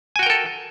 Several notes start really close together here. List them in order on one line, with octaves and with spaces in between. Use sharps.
G#5 F#4 G5 A#4 A4